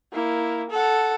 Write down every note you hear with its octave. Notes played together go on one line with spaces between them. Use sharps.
A#3 E4
A4 F#5